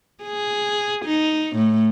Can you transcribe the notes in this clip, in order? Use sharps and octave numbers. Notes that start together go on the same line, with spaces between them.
G#4
D#4
A2